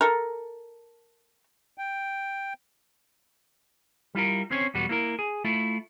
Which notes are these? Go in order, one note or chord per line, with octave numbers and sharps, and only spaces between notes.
A4 A#4
G5
G3 E4 F4 A#4
C4 C#4 C5 C#5
B1 E2 G3 B3 F#4
A#3 E4 A#4
G#4
A3 E4 F4